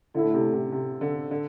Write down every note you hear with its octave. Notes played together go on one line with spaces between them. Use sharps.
A2 D3 A3 E4
C3
C3
C3
D3
D3